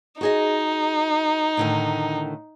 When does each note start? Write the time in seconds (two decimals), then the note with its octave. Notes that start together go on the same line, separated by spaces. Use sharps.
0.21 D#4 F#4 G#4 D#5
1.57 A2 D3 D#3